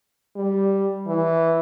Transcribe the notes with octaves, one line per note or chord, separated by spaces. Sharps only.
G3
E3